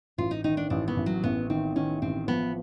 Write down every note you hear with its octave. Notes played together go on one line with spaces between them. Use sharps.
A1 F4
D#4
D#3 D#4
D4
A1 D4
B3
A1
F#3
A1 B3
D#3 C4
D#3 C#4
A1 C4
F3 B3